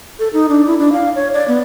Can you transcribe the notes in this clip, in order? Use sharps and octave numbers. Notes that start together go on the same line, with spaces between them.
A4
D#4
D4
E4
D4
F5
C#5
D5
B3